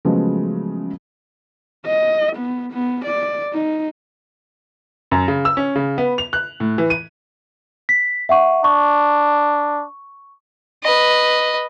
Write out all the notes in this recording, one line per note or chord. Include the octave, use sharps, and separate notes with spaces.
C#3 F3 F#3 G#3 A3 B3
D#5
B3
B3
D5
D#4
F#2
C#3
E6
C#4
C#3
B3
F7
F#6
A2
E3
D#7
B6
E5 F#5 C#6
D4 C#6
B4 D#5